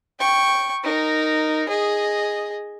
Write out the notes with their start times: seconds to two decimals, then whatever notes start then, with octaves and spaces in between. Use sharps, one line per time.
0.20 G5 C#6
0.84 D#4 A#4
1.69 G#4 D#5